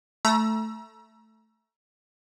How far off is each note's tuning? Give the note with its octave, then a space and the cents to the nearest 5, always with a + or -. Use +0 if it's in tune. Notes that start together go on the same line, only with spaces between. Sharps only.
A3 +0 A#5 +30 E6 +15